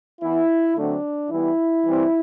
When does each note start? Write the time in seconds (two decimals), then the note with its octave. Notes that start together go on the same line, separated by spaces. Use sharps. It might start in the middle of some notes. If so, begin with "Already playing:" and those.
0.22 E3 B3 E4
0.76 D3 F#3 A3 C4 D4
1.30 E3 G3 B3 E4
1.85 E3 G3 C4